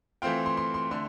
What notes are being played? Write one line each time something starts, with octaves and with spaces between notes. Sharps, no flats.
E3 A3 C4 F4 G5
C6
C6
C6
D3 A3 C6